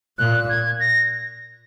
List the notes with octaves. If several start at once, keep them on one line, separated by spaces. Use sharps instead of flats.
A#2 F#6
G#6
A#6